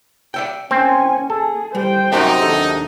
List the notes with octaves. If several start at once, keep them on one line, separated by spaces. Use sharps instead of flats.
D5 E5 G5
A#3 C4 C#4 G#5
G#4 A4
G3 C5 G5
F#2 C3 D#4 F#4 G4 E5
D#2 D4 A4